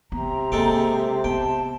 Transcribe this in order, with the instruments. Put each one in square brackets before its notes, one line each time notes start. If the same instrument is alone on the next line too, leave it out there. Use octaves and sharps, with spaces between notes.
[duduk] C3 [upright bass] B3 [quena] A#5
[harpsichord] G#3 A4 G5 [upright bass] A#3
[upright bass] B3 [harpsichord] G5 [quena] A5